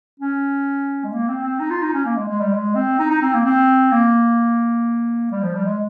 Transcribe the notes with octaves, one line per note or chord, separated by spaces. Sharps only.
C#4
G#3
A#3
C4
C4
D#4
F4
D#4
C#4
A#3
G#3
G#3
G3
G#3
C4
D#4
D#4
C4
A#3
C4
A#3
G3
F3
G3
G#3